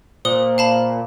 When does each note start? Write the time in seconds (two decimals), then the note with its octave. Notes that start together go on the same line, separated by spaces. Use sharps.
0.25 A#2 C5 D#6 G7
0.58 F5 A5 B5